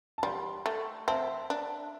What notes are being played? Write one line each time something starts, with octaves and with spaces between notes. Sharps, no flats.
A5
G3 G5 C6
A3
C4 E5 A5
D4